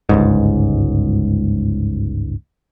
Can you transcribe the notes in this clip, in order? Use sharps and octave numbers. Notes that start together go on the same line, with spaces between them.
G1 C#2 G#2